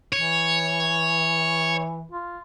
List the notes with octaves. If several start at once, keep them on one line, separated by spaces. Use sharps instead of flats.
E3 C#5
F4